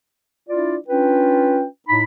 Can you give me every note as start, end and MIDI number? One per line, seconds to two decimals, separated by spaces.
0.49 0.76 62
0.49 0.76 64
0.49 0.76 65
0.49 0.76 74
0.88 1.64 61
0.88 1.64 62
0.88 1.64 65
0.88 1.64 71
0.88 1.64 79
1.88 2.02 45
1.88 2.02 63
1.88 2.02 83